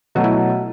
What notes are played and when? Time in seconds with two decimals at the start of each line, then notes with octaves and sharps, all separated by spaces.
0.15 B2 F#3 A3 F#4
0.24 E4